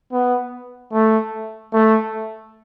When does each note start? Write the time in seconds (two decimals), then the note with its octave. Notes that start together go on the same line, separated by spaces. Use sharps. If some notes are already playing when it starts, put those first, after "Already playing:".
0.12 B3
0.93 A3
1.73 A3